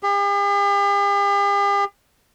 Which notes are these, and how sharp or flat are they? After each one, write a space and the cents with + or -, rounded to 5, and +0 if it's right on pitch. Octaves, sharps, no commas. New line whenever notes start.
G4 +45